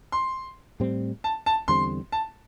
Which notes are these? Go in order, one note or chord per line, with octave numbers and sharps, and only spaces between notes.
C6
A2 G3 C4
A5
A5
E2 D3 G3 C4 C6
A5